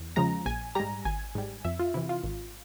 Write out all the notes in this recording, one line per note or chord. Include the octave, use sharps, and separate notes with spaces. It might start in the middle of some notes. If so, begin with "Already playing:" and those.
Already playing: E2
C#3 F3 G#3 A#5
A#1 G#5
G#2 G3 A#5
G#1 G#5
G#2 G3
F2 E5
F4
C3 E3 E4
F4
G#1